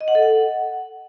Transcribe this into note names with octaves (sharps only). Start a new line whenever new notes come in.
D#5
F#5
A4
F#5